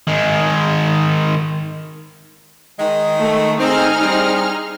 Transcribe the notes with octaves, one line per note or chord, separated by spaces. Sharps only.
D#3 G#3
D#3 G#3
A3
C4 D#4 G#4 F6
G3 C4